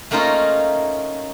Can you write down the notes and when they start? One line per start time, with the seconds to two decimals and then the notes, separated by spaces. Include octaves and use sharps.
0.11 A3 A#3 C#4 D#4 F4 A#4